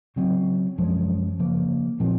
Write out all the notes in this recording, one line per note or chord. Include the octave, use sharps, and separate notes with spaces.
C#3 F#3 C4
F#2 F3 G#3 C#4
C#3 F3 A#3
A#2 F3 C4